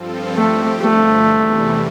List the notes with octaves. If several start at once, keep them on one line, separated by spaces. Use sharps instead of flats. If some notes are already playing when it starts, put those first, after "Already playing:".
Already playing: G2 F3 C4 F4 A4
G2 F3 A3 C4 G4
G2 D3 F3 A3
E2 C3 E3 G3